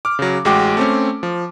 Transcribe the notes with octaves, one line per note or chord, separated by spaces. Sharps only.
D6 F6
C#3 F#3
A1 G#3 F#4 G5 D6
A3 C4 C#4
F3